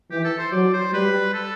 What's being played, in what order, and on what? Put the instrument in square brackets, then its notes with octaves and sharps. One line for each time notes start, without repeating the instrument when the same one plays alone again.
[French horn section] E3 [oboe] G4
[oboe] A4
C5
[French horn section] F#3 [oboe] D5
[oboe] C5
[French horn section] G3 [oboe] B4
[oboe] A4